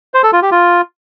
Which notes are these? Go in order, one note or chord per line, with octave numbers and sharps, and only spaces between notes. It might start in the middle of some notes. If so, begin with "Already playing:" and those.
C5
A4
F4
G4
F4